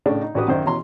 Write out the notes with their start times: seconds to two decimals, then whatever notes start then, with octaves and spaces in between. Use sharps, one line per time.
0.06 A2 C#3 D4
0.22 D#4
0.35 A1 D4 F#4 G4 B4 D#6
0.48 F#2 D#3 C5 D5 E5
0.65 B2 E3 C#4 A#5 C6